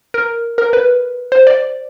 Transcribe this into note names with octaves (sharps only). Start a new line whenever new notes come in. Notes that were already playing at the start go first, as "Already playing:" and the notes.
A#4
A#4
B4
C5
D5